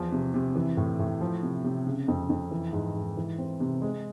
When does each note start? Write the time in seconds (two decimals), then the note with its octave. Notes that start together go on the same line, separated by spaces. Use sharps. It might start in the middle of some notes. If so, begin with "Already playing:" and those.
Already playing: E2 F3
0.12 C3
0.34 C3
0.55 E3
0.77 A2
0.99 A2
1.21 F3
1.43 C3
1.64 C3
1.86 C#3
2.08 F2
2.30 F2
2.51 E3
2.73 G#2
2.95 G#2
3.17 E3
3.38 C4
3.60 C3
3.82 G#3